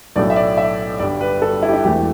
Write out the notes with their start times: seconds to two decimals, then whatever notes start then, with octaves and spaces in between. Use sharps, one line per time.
0.16 B1 A2 A3 D5
0.30 E5
0.36 D5
0.58 E5
0.99 G1 G2 G3 D4 D5
1.21 B4
1.42 A4
1.63 E4
1.69 G4
1.73 E4
1.84 E1 E2 E3 A3 G4